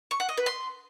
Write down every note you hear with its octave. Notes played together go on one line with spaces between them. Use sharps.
C#6
F#5
D#5
B4
C6